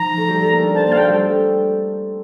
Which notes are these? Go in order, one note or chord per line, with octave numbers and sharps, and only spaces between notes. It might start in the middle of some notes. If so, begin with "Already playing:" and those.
Already playing: F3 D#4 F4 A#5
A3 A4
G3 G4
A3 A4
A#3 A#4
D4 D5
C4 C5 A5
A#3 A#4 A5
F5
A3 A4 G5
G3 G4